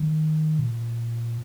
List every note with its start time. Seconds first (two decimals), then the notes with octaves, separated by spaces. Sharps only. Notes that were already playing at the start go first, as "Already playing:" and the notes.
Already playing: D#3
0.59 A#2